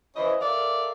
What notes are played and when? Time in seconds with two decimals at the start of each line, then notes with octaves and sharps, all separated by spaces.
0.16 E3 C#4 E4 C5 D#5
0.41 A4 A#4 D5 E5 F5